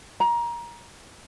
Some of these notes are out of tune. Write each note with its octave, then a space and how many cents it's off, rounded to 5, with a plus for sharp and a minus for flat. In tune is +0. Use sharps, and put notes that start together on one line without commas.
A#5 +20